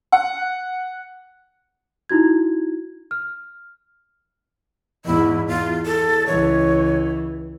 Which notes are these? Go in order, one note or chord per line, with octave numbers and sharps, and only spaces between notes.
F#5
D#4 E4 F#4 G#6
F6
E2 G#2 E4
E2 F4
A4
C#2 E3 C#5